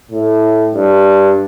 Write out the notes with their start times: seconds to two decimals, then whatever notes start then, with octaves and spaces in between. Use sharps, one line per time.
0.11 A2
0.74 G2